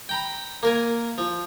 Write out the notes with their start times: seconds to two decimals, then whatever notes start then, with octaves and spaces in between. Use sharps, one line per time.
0.09 G5 A#5 B5
0.63 A#3 A#4 G#5
1.18 F3